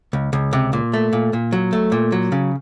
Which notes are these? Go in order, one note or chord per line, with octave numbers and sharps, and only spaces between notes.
C#2
C#2
C3
A#2
A3
A#2
A#2
F#3
A3
A#2
F#3
C#3